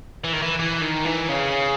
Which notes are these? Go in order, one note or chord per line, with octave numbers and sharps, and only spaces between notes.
E3
D#3
E3
E3
D#3
E3
C#3